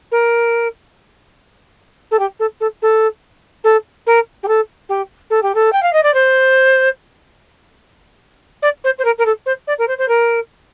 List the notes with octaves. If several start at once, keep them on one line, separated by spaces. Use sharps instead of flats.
A#4
A4
G4
A4
A4
A4
A4
A#4
G4
A4
G4
A4
G4
A4
G5
F5
D#5
D5
C5
D5
C5
C5
A#4
A#4
A4
C5
D5
A#4
C5
C5
A#4